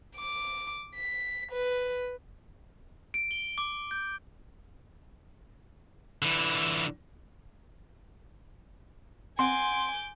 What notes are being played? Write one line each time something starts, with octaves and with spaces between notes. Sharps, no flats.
D6
B6
B4
D7
G7
D6
G6
D3 E3
C4 F#5 G#5 C6 D6 G6